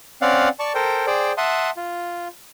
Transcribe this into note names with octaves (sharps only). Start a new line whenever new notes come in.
C4 C#4 D5 F5 F#5
D5 A5 C#6
A4 A#4 C5 G5
G#4 C5 D5 G5
E5 F#5 A5 C6 D#6
F4